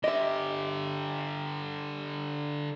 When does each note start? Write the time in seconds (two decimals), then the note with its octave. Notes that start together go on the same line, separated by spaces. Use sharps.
0.04 D3 G4 D#5 E5